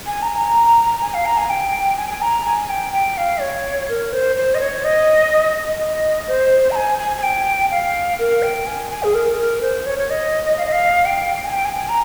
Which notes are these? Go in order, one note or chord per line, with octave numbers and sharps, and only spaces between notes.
G#5
A#5
A#5
G#5
F5
A#5
G#5
G5
G#5
G#5
A#5
G#5
G5
G5
F5
C#5
A#4
C5
C5
D#5
C#5
D#5
D#5
C5
A#5
G#5
G#5
G#5
G5
F5
A#4
G5
G#5
G#5
G#4
A#4
A#4
C5
C#5
C#5
D#5
F5
D#5
F5
G5
G#5
G5
G#5
G#5
A#5